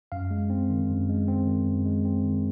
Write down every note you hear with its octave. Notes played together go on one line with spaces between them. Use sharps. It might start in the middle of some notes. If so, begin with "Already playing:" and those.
F#2 F5
G#3
C4
D#3
F#2
G#3
C4
D#3
F#2
G#3
C4
D#3